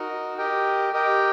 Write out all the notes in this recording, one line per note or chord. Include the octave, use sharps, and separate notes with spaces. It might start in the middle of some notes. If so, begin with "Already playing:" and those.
Already playing: D#4 F#4 A#4 D#5
G4 A#4 D#5 G5
G4 A#4 D#5 G5